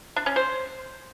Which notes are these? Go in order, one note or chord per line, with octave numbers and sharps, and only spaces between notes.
D4
C#4
C5